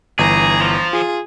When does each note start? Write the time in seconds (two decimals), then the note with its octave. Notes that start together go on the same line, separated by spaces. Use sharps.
0.19 G1 E3 G#4 A#5
0.60 F3
0.93 F4 G#4